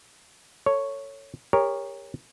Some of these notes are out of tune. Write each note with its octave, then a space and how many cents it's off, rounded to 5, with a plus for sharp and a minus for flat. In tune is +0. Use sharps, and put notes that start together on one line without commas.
A4 +25 C#5 +0
G4 +35 A#4 +0 C#5 +0